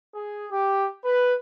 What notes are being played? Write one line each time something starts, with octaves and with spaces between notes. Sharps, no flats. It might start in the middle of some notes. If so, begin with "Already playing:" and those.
G#4
G4
B4